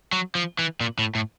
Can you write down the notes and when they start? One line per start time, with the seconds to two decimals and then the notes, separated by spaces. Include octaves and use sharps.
0.12 F#3
0.35 F3
0.59 E3
0.81 A#2
0.99 A2
1.15 A2